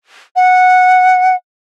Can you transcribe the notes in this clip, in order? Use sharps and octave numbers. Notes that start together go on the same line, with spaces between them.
F#5